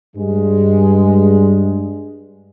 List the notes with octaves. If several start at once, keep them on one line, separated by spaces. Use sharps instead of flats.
G2 G#3